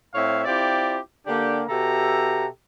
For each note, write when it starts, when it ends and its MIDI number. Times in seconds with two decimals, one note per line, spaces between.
0.14 0.43 45
0.14 0.43 60
0.14 0.43 73
0.14 0.43 76
0.14 0.43 77
0.45 0.98 60
0.45 0.98 64
0.45 0.98 65
0.45 0.98 67
0.45 0.98 74
1.26 1.62 50
1.26 1.62 58
1.26 1.62 62
1.26 1.62 67
1.69 2.46 47
1.69 2.46 67
1.69 2.46 69
1.69 2.46 76
1.69 2.46 82